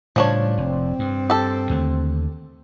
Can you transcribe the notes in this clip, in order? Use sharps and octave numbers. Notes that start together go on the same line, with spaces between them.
A2 C#3 F3 G3 D4 C#5
F1 C4
G2
G4 A4
D#2 D3 A3